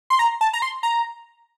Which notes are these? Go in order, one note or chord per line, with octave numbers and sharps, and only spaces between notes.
C6
A#5
A5
A#5
C6
A#5